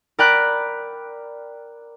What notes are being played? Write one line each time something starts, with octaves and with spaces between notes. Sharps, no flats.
A#4 D5 G5 A#5 B5 F#6